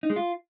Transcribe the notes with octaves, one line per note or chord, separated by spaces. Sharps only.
D#4
G#3
F4